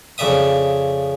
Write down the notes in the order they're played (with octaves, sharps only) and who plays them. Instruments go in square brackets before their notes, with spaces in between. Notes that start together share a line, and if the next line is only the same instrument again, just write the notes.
[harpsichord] F2 C#3 D5 E5 D#6